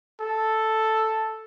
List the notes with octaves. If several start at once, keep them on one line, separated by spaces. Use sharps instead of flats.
A4